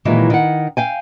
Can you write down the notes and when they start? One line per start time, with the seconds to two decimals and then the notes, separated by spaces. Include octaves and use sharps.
0.05 A#2 D#3 E3 F#3 G#3
0.30 D#3 F#5
0.77 F5 G5 G#5